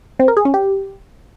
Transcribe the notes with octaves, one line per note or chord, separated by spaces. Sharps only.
C4
A#4
G#4
C#4
G4